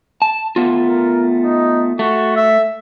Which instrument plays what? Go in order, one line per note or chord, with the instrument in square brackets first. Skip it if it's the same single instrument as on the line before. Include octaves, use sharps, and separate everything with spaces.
[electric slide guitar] A5
A3 B3 F4
[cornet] A#4
D#4
[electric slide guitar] A3 [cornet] F#4
[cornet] E5